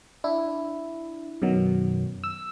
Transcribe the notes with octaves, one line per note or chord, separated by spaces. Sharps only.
D4 E4
F#2 B2 D#3 F#3
E6